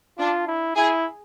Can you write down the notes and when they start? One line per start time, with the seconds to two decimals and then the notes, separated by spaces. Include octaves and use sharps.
0.19 D4 F4
0.47 E4
0.76 E4 G#4